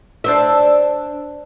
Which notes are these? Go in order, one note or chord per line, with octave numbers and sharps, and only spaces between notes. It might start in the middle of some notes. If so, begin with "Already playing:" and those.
D4 C5 E5